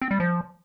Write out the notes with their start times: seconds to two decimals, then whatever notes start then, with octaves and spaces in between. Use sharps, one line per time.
0.02 C4
0.11 G3
0.20 F3